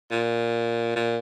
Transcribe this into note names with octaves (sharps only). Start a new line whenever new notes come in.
A#2
A#2